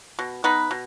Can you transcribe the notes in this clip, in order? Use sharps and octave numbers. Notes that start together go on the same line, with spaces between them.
B2
B3 D#4 B4
B2